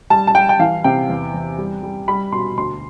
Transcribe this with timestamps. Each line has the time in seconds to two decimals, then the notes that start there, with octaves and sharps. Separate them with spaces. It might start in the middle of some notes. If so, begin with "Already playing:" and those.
0.10 G3 A5
0.27 A5
0.35 G3 G5
0.49 G5
0.59 E3 F5
0.84 C3 G5
1.09 E2
1.34 E2
1.58 G3
1.83 G3
2.08 G3 B5
2.32 B2 C6
2.57 D2 C6